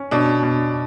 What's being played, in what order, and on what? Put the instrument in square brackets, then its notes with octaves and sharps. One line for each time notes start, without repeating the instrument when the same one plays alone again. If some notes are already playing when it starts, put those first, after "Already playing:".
Already playing: [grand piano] C#4
[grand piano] B2 [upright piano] D4
[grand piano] B2